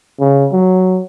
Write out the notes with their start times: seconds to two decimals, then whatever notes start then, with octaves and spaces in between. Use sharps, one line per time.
0.20 C#3
0.52 F#3